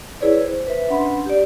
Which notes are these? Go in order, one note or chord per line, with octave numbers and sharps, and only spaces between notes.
E4 G#4 B4 C#5 D5
C5
B4 E5
C#4 D4 B4 F#5 B5 C6
G4 D5